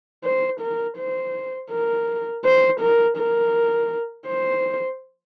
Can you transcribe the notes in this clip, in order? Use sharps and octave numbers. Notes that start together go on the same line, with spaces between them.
C5
A#4
C5
A#4
C5
A#4
A#4
C5